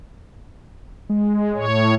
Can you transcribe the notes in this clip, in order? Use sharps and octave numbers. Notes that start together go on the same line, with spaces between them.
G#3
A2 C#5